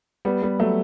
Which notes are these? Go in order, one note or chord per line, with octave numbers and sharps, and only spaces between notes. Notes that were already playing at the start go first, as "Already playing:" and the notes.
G3 B3
G3 B3
F#3 A3